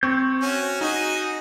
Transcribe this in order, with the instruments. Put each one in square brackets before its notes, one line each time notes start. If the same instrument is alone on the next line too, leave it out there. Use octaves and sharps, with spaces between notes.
[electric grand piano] C4 [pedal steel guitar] C#6 G6
[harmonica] C#4 F#4
[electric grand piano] D#4 [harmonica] F#4 G#4 D#5